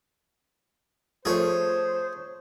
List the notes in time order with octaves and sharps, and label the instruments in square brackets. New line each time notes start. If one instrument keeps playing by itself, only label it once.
[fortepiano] F3 A3 [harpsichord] G#4 C#5 [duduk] C5